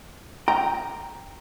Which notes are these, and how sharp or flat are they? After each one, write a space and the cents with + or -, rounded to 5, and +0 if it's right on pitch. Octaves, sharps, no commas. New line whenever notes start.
G5 +0 A#5 +0